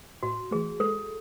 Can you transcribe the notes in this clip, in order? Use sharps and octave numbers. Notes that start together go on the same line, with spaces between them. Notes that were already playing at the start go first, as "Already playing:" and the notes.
A2 F#4
E3 A3 G#4
G#3 A4